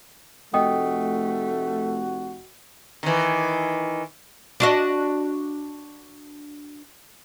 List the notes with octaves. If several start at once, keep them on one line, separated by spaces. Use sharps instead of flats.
F1 A3 F#4 D#5 G5 D#6
D#3 E3
D4 F#4 D#5